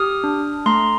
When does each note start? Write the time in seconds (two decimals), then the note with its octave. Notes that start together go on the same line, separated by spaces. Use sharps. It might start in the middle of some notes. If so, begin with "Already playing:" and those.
Already playing: G4 D#6 F6
0.24 D4
0.66 A3 A#5 C6